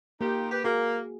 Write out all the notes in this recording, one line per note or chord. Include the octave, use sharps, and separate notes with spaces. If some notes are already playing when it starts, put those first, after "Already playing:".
A#3 D#4 F4 G4
G4 B4
A#3 F#4 G#4 A#4